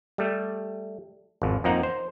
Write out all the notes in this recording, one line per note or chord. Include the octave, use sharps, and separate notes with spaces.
G3 A3
G#1 F2
F2 F3 A#3 D#4 F#5 A#5
C5